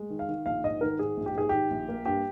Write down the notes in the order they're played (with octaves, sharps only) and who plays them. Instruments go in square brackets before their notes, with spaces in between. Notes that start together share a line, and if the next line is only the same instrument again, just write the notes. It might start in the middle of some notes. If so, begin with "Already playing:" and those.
Already playing: [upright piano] G#3
D#3
F5
D#3
A#1 F5
G#2 D#5
D#3 A#4
G#2 G#4
A#1
G4
G#2 G#4
D#3 G4
A#1
A#3
G2 G4